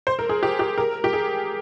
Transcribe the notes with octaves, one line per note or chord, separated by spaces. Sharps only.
C5
A#4
G#4
G4
G4
A#4
G4
G#4